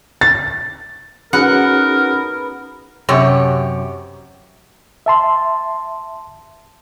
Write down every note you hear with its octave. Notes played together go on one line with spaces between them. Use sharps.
A6
B3 C#4 D#4 F#4 G#4 A#4 F#5
F#2 C3 G4 C#5
E5 A5 C6